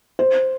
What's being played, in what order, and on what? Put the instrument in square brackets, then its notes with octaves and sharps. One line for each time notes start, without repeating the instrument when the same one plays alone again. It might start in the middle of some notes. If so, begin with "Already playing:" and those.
[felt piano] C5